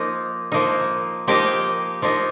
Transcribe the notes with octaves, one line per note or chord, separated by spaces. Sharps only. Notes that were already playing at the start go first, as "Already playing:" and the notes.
Already playing: F3 A#3 D#4 D#5
F3 A#3 D#4
F3 A#3 D#4 G4
F3 A#3 D#4